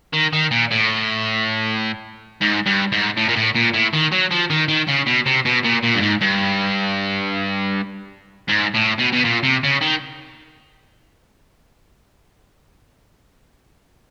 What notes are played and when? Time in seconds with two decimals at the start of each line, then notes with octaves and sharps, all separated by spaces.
0.13 D#3
0.33 D#3
0.51 A#2
0.71 A2
2.42 G#2
2.66 G2
2.92 G#2
3.17 A2
3.28 A#2
3.36 A2
3.55 A#2
3.74 A2
3.94 D#3
4.12 F#3
4.31 F3
4.50 D#3
4.68 D#3
4.88 C#3
5.07 B2
5.26 C3
5.45 B2
5.64 A#2
5.84 A#2
5.96 G2
6.01 G#2
6.21 G2
8.49 G#2
8.75 A2
8.99 B2
9.13 B2
9.25 A#2
9.43 C3
9.63 C#3
9.81 D#3